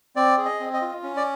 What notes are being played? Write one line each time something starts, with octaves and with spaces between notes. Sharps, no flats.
C4 D5
G#4
D#5
C4
D#5
F4
C#4
D5